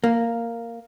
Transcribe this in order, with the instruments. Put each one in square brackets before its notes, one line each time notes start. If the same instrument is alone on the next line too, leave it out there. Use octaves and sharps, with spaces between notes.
[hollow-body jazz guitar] A#3